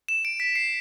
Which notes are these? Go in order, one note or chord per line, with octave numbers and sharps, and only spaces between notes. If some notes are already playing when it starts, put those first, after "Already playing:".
E7
D7
B6
C7